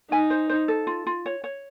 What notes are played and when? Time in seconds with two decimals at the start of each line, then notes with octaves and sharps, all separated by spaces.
0.11 D#4 G#5
0.30 C5
0.49 C5
0.68 A4
0.87 F4
1.07 F4
1.26 C#5
1.44 C#5